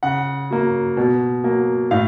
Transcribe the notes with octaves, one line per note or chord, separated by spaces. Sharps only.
C#3 F#5
F#3 A#3
B2
F#3 A#3
A2 F5